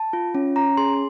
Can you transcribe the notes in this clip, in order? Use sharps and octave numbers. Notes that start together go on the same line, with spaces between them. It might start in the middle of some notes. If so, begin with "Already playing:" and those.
Already playing: A5
F4
C#4
C#4 A#5
G#4 C6